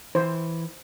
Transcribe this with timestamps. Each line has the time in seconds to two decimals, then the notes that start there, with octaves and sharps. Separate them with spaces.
0.15 E3 C5